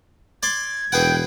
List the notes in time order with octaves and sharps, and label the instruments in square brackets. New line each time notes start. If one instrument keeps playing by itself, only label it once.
[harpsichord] D5 C6 D6 [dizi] G#6
[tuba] E1 [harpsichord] G#4 B4 F#5 [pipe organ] G5